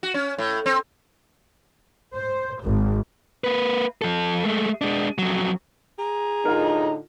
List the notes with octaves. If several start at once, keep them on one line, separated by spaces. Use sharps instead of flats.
F#4
C#4
A2
C4
C5
G#1
A#3 B4
F3 A4
G#3 A3
G#3 D4
F2 F#3
G#4 A#5
A2 D3 D#4 F4 A#4